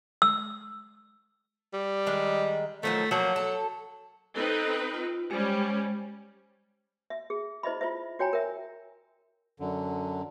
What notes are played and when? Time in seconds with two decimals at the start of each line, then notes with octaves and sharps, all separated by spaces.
0.22 E6
1.73 G3
2.07 D#3 G#3
2.83 D#3 F3 F#3 A3
3.11 F3 F#3 A#3 F#4
3.36 A4
4.36 C4 D#4 A4 B4
4.94 F4
5.31 G3 G#3 C#4 C5
7.10 E5
7.30 G#4
7.63 E4 C5 D#5 E5 B5
7.81 F4 C5 E5
8.19 F#4 C#5 G5 G#5 A#5
8.33 A#4 E5
9.60 F#2 D3